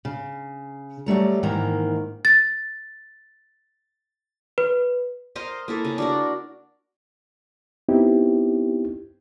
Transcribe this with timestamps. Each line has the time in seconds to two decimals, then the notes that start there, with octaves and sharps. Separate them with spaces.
0.05 C#3
1.06 F#3 G3 A3 A#5
1.43 G#2 D#3 E3 A#3 A#5
2.25 A6
4.58 B4
5.35 A#4 C5 D#5 F5
5.68 A#3 E4 A4
5.85 C#3
5.98 D4 F#4 A#4
7.89 B3 C4 D#4 E4 G4